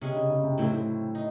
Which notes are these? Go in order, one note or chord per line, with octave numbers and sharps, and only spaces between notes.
C3 G#3 C#4 G#4
C#3
C#3
C3
A2 F#3 C4 E4
A2
D#4